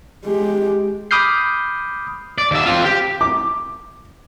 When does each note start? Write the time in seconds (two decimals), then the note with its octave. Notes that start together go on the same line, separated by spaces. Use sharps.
0.25 G#3 G4
1.11 B5 D6 D#6 F6 G6 C7
2.38 D5
2.51 D#2 E5
2.66 C4 F4
2.85 G4
3.21 D6